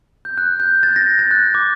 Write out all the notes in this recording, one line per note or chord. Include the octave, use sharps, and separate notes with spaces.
G6
F#6
G6
A6
A#6
A6
F#6
D6